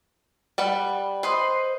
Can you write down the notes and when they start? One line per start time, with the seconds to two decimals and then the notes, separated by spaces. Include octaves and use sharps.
0.58 G3 B4 F#5
1.23 B4 C5 D#5 C6